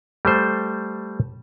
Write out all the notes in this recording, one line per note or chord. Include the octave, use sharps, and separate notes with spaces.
G3 A3 C5